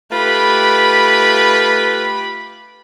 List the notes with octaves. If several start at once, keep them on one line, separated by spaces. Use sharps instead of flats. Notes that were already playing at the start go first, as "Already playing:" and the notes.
A3 F4 G4 B4 B5